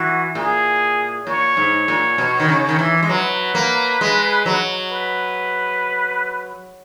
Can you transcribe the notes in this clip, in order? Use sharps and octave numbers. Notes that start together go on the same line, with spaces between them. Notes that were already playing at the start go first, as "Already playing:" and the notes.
Already playing: E3 F#4
A#2 G#4
A#2 C#5
G#2
A#2
B2
D#3
C#3
D#3
E3
G#3
F#3 B4
A#3
G#3
F#3
B4